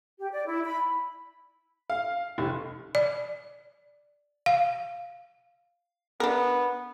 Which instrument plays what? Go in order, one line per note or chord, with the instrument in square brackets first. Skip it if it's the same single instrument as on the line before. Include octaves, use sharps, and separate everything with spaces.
[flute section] G4
D5
E4
B5
[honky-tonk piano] F5
F1
[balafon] D5
F5
[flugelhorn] B3 [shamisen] D4 A#4